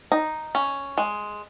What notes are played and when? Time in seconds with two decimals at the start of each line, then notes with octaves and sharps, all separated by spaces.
0.12 D#4
0.55 C#4
0.98 G#3